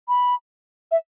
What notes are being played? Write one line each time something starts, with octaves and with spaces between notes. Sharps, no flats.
B5
E5